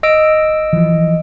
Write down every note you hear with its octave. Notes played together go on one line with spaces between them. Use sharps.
D#5 E6 D7
E3 F3